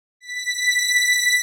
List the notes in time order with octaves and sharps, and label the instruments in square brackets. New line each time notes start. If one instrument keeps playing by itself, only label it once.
[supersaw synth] B6